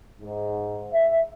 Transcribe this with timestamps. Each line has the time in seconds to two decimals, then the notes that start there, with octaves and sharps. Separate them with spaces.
0.21 G#2
0.92 E5